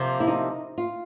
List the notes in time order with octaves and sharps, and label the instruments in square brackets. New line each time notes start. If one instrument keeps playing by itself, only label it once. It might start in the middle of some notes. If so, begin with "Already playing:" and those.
Already playing: [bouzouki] C3 F3 A#3
[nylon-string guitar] E4
D#4
F4